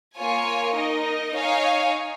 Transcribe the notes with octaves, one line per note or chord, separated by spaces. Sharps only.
A#3 F4 C#5 G#5
D#4 A#4 D#5
D#4 C#5 F5 G#5